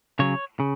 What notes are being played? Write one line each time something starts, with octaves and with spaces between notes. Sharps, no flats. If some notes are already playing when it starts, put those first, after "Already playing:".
C#3 F#3 C#5
C#3